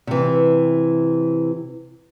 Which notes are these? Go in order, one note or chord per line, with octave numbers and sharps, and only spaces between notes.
C3 E3